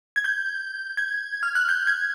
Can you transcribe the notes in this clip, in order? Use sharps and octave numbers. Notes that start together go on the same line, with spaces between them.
G#6
G6
G#6
F6
F#6
G6
G#6